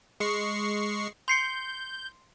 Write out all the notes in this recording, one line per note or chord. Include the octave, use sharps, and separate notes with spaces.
G#3 C#6 C7
C6 G6 C7 C#7